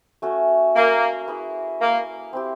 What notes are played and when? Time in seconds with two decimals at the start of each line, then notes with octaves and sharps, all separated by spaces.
0.22 A3 C#4 F#4
0.75 A#3
1.28 E4 G#4 B4
1.81 A#3
2.33 C4 E4 G4